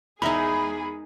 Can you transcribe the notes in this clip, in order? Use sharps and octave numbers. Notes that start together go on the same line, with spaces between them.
E2 G#3 D#4 G#4 A#4 E5 A#5 B5